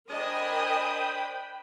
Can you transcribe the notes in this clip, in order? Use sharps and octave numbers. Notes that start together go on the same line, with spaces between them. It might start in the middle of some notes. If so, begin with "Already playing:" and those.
D4 A#4 C5 D#5 G5 G#5 B5 D#6